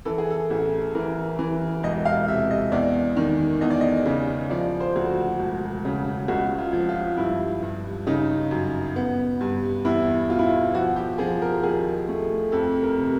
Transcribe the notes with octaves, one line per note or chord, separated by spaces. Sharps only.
E3 A4
G#4
A4
A1
E3 A#4
E3
E1 D#5
F5
C3 E5
D#5
E2 D5
D#3
E2 D#5
D5
D#5
C#3
F3 D5
C5
D2
F#4
E1
C#3
C#2 F#4
F4
F3
F4
G2 E4
G2
C#3 D#4
F#2
B3
G2
E2 E4
B2 F4
E4
F4
F3 F#4
G4
F3 G#4
A#4
D#2 G#4
A3
F2 A4
A#4
C3